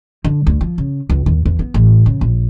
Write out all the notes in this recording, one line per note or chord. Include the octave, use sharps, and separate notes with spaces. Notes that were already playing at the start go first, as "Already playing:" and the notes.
D3
D2
F3
C#3
C#2
D#2
E2
B3
A1
C#3
A#1